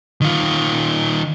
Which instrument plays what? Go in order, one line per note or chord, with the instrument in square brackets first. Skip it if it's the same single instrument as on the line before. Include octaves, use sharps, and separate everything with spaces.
[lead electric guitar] D#3 F4